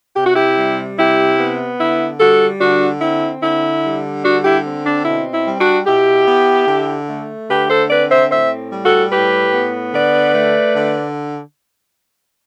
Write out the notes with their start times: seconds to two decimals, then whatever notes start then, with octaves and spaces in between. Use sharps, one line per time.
0.16 C3 G4
0.26 F#4
0.36 E4 G4
0.57 G3
0.98 C3 E4 G4
1.40 B3
1.80 D3 E4
2.20 G3 F#4 A4
2.61 D3 D4 F#4
3.01 C4 E4
3.42 D3 E4
3.84 G3
4.24 D3 D4 F#4
4.45 E4 G4
4.65 C4
4.85 D4
5.05 B2 E4
5.33 E4
5.47 G3
5.60 D4 F#4
5.86 B2 E4 G4
6.27 B3
6.68 D3
7.08 A3
7.50 D3 G4 B4
7.70 A4 C5
7.90 C4 B4 D5
8.11 C5 E5
8.31 A2 C5 E5
8.72 G3
8.85 F#4 A4
9.12 A2 G4 B4
9.53 B3
9.94 D3 B4 D5
10.34 A3
10.76 D3